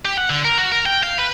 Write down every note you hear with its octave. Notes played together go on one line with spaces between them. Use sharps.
G4
F#5
D3
A#4
F#4
A#4
G5
F5
B4